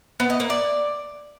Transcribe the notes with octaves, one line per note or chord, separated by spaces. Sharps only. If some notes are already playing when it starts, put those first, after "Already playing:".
B3
D#5
A#3
D5